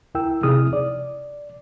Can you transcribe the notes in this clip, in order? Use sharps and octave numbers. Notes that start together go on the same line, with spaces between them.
C#2 E4 A#4 G5 E6
C3 D#4 E4 G#4 D#6 F6
D5